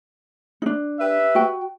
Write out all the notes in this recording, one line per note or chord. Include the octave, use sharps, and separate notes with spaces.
D4 D#4
G4 B4 E5
F#4 G5